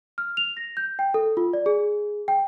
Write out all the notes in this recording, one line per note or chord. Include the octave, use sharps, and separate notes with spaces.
F6
F7
A#6
G6
G5
A4
F4
D5
G#4
G5